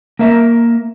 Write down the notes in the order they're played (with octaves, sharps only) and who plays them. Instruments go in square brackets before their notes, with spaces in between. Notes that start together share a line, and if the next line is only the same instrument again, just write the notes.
[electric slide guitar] A#3 A#4 E5